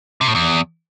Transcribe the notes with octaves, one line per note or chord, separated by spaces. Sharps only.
C3
A2
E2